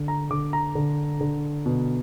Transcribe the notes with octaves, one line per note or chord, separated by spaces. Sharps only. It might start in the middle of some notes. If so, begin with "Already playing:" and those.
Already playing: D3
A#5
D3 D6
A#5
D3
D3
B2